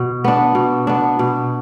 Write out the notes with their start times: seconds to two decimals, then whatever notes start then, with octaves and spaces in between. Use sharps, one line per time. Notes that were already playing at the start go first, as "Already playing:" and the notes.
Already playing: B2
0.24 B3 D4
0.55 B2
0.87 B3 D4
1.19 B2